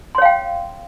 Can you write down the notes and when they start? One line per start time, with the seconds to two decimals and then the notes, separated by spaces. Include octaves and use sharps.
0.15 C6
0.18 C#5
0.22 F5
0.25 G5